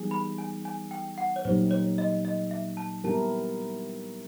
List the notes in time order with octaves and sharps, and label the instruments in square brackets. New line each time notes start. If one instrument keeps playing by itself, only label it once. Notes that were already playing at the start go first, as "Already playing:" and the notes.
Already playing: [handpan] E3 G3 B3 D#4 G#4
[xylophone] B5
G#5
G#5
G5
F#5
C#5
[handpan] A#2 F#3 A#3 D#4 G4 [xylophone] C5
[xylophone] C#5
D#5
D#5
E5
A5
[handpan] G3 B3 E4 G4 A#4 [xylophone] A5